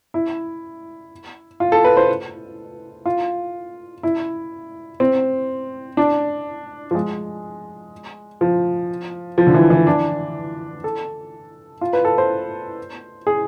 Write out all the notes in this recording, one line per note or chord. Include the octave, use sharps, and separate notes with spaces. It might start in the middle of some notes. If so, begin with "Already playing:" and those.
E4
F4
A4
B4
C5
F4
E4
C4
D4
F3
G#3
F3
F3
D3
E3
E3
D4
A4
F4
B4
A4
C5
G#4